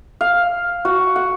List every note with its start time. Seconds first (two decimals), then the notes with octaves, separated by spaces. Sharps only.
0.21 F5
0.85 F#4
1.16 F#5